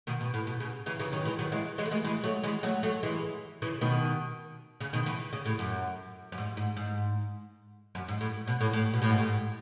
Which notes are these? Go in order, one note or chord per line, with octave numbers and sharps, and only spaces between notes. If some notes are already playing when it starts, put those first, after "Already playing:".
B2 D#3
B2
A2
B2
C#3
C#3 E3
C#3 E3
D#3 F#3
E3 G#3
D#3 F#3
E3 G#3
E3 G#3
A3
E3 G#3
E3 G#3
F#3 A3
E3 G#3
F#3 A3
F#3 A3
E3 G#3
C#3 E3
B2 D#3
C#3
B2 D#3
C#3 E3
C#3
A2
F#2
F#2
G#2
G#2
G#2
F#2
G#2
A2
B2
A2
A2
B2
A2
G#2
A2